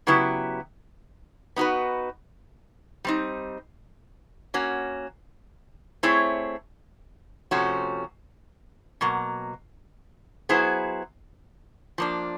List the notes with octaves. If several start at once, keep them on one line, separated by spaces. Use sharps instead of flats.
C#3 F#3 B3 E4 G4
B3 D#4 F#4 B4
G3 C4 D#4
A#3 C#4 F#4
A3 C4 E4 G#4 C#5
C3 F3 A3 C#4 F#4
B2 F#3 A#3
F#3 B3 E4 G#4 C5
F3 A#3 D4